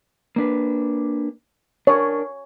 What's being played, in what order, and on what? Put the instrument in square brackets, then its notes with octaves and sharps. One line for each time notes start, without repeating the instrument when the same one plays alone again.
[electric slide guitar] A#3 D4 B4
[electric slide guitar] D4 A#4 [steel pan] C#5